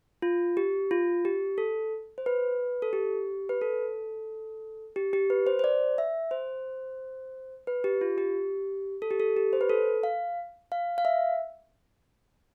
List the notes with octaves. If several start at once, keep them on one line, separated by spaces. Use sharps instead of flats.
F4
G4
F4
G4
A4
C5
B4
A4
G4
B4
A4
G4
G4
B4
C5
C5
D5
E5
C5
B4
G4
F4
G4
A4
G4
A4
G4
C5
B4
A4
F5
F5
F5
E5